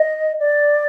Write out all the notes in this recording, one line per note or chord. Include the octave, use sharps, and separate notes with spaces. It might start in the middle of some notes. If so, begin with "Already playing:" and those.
Already playing: D#5
D5